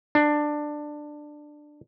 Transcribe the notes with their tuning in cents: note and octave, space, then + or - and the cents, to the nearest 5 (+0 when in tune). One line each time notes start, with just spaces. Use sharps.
D4 +15